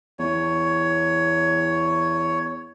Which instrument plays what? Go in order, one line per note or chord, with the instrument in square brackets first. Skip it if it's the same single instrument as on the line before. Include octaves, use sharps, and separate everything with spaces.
[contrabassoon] E2 [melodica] C#5